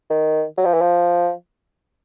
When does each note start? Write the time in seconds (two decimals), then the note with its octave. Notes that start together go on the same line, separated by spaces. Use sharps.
0.10 D#3
0.57 F#3
0.65 F3
0.74 E3
0.81 F3